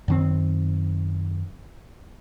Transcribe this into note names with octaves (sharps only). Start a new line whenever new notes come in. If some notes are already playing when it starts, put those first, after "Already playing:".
F#2 D#3 C4